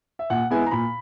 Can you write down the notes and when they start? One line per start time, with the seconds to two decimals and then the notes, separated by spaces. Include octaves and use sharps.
0.19 E5
0.30 A#2 F#5
0.50 G#3 B3 E4 G#5
0.66 A#5
0.71 A#2 B5